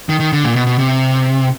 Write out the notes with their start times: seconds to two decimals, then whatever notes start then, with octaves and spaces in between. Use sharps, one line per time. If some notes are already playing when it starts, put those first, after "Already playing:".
0.09 D#3
0.20 D#3
0.33 D3
0.44 A#2
0.56 B2
0.67 B2
0.79 C3